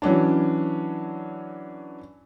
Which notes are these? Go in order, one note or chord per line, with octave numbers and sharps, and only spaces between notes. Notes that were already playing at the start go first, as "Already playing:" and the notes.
E3 F#3 C#4 D4